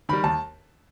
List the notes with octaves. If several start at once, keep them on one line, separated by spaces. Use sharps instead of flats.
D#3 G3 B5
D#2 A5